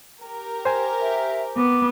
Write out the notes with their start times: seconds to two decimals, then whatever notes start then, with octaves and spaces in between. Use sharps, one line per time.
0.21 G4 A#4
0.65 C5 G#5
1.01 E5
1.57 B3 D6